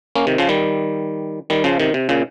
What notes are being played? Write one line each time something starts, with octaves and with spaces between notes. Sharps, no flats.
A#3 C#4
C3 D#3
C#3 F3
D#3 G3
D#3 G3
C#3 F3
C3 D#3
C3
A#2 C#3